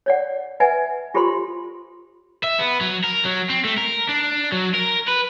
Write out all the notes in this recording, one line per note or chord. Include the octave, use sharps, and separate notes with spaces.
C#5 D5 F#5
B4 D#5 E5 F#5 G#5
F4 G4 A4 C5 B5 C6
E5
B3
F#3
A#4
F#3
C4
A3
A#4
D4
F#3
A#4
B4